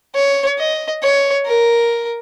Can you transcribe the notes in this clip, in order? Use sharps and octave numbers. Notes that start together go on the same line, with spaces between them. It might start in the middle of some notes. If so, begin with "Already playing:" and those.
C#5
D#5
C#5
A#4